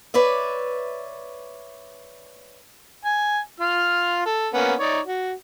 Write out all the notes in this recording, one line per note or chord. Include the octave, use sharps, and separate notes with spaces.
B4 C#5 D5 E5
G#5
F4 F6
A4
A#3 B3 C#4
D#4 C#5 D5
F#4